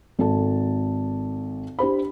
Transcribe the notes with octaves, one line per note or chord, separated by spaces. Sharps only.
G#1 A4 A5
D4 G4 C5 B5